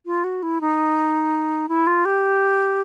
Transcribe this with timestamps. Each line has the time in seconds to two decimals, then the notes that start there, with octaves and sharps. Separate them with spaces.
0.06 F4
0.24 F#4
0.43 E4
0.61 D#4
1.69 E4
1.87 F4
2.05 G4